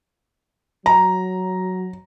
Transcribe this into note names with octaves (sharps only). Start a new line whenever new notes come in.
F#3 A#5